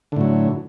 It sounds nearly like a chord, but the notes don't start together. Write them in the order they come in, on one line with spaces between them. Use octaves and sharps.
D3 A2 F#3